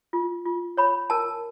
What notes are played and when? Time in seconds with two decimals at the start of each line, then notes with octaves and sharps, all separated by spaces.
0.13 F4
0.46 F4
0.77 C#5 B5
1.10 A#4 A5